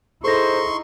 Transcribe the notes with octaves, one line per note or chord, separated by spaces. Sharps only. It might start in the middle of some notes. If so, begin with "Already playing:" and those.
D#4 E4 G#4 A4 C5 C6 C#6 A#6